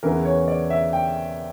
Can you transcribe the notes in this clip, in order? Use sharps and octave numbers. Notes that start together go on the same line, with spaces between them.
E2 C#3 E3 A#4
C#5
D5
E5
G5